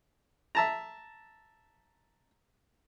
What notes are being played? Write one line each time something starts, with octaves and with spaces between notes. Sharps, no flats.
E5 A5 A#5